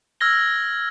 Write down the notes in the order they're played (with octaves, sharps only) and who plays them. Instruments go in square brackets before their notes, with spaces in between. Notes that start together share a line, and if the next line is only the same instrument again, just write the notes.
[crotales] E6 F6 G#6 A#6 G7